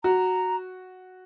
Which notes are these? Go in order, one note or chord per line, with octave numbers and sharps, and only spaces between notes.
F#4 A#5